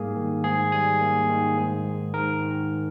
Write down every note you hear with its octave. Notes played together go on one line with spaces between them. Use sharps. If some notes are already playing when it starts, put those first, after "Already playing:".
Already playing: G#2 G3 A#3 G#4
D#3
G#2 G#4
G3 G#4
A#3
D#3
G#2
G#3
G#2 A#4
D#3